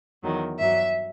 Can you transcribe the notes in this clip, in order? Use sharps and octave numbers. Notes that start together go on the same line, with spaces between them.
E2 D#3 F#3
G2 F#3 E5